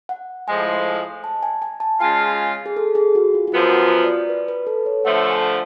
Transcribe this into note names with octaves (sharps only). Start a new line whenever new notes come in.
F#5
A2 F3 G#3 G#5
A5
G#5
G#5
A5
C#3 G#3 C#4 F4 G#5
G#4
A4
G#4
F#4
F4
F#4
F#2 F3 B3 F4
F4
D5
B4
B4
A4
C#5
D3 F3 A3 F#5
G#5